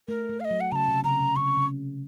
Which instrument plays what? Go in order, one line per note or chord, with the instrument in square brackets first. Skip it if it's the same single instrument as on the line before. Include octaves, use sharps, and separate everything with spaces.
[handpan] A3 [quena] A#4
[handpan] A3
[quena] F5
D#5
[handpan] F#3
[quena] F#5
[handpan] C#3 [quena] A5 A#5
[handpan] C3
[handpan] C#3 [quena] A#5
[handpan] C3
[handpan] C#3 [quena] C#6
[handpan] C#3